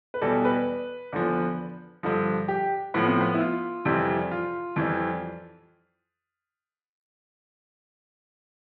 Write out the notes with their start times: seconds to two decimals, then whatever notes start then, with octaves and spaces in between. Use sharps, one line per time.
0.14 B4
0.22 E2 B2 G3 A4
0.45 B4
1.12 E2 D3 F3
2.03 G2 D3 F3
2.48 G4
2.94 A2 F3 B3
3.08 C4
3.21 B3
3.35 E4
3.41 F4
3.85 F2 C3 E3 G3
4.31 F4
4.76 F2 E3 G3